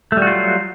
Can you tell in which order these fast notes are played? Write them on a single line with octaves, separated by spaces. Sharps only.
A3 G3 F#4 F4 F#3